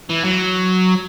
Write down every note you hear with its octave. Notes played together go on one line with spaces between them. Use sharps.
E3
F#3